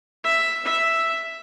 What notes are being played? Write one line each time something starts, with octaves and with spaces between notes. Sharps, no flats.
E5
E5